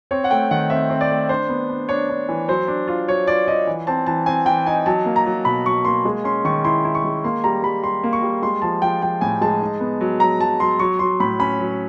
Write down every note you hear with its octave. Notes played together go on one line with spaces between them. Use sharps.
C4 C#5
F#5
A3 G5
D#3 F#5
C4 E5
C4
D5
A3
D4 C5
B3
D4
D4 C#5
D4
E3
F#3 C5
D4
F4
F#3 C#5
F4 D5
F4 D#5
E3
C4 A5
E3 A5
C4 G#5
E3 G5
D#4 G#5
F#3 A5
A#3
A#5
F#3
B2 B5
F#3 C#6
A#3 C6
G#3
C#4 C6
D#3 C#6
E4 C6
E4
C#6
G#3
A#3 C6
G3 A#5
G3 B5
G3 C6
A#3
C#6
G3
G#3 C6
F3 A5
F3 G5
F3 G5
A2 G#5
G#3 A5
D#4
B3
F#3
F#3 A#5
F#3 A5
F#3 C6
F#3 C#6
F#3 C6
A2 B5
C#4 B5
F#3